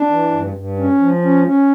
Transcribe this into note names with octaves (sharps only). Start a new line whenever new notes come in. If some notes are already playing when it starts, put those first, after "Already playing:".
Already playing: D4
E3
G2
G2
C#4
F3
C#4
C#4